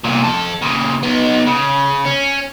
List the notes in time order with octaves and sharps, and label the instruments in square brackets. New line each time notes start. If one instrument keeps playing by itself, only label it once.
[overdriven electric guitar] C2 A#2
F2 A4
A#2 C#3
B3 D#4
C#3
C#4